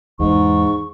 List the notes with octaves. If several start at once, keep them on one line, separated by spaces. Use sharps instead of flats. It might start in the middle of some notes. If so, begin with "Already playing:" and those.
E2 G#2 C#6